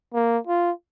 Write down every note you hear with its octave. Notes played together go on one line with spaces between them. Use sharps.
A#3
F4